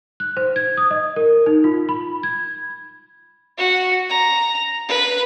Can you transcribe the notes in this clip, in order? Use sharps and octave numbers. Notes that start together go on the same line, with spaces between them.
F#6
C5
G#6
D#6
D#5
A#4
D#4
F4
B5
G#6
F#4
A#5
B4